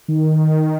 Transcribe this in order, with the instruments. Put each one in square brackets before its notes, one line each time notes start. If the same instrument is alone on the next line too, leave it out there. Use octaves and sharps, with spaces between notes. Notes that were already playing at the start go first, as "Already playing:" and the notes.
[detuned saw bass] D#3